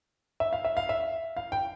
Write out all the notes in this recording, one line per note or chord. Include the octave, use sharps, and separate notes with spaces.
E5
F5
E5
F5
E5
F5
G5